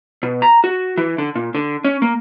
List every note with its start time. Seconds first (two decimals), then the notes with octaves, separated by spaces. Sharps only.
0.23 B2
0.42 A#5
0.64 F#4
0.97 E3
1.18 D3
1.35 A#2
1.55 D3
1.84 C#4
2.02 A#3